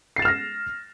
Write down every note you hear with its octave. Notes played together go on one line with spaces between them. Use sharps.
F6 A6 A#6 C7 E7